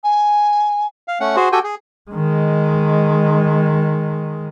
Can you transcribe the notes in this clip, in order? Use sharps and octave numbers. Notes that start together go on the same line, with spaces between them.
G#5
F5
A3 C#4 F#5
F#4 G#4 C5
F#4 G4 A4 G5 G#5
G#4
D#3 G#3